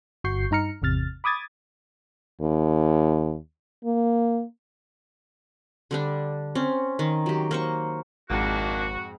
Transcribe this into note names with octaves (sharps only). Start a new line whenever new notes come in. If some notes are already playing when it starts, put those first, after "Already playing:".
G1 F#4 C#6 G6 C7
G2 D#4 A#5 F6 C#7
G#1 E2 C3 F6 A6
B5 D6 D#6 G#6 A6
D#2
A#3
D3 G3 D4
C4 C#4
D#3
F#3 G4
A#3 C5 C#6
G#1 F2 G#2 D#3 A#3 D4 F#4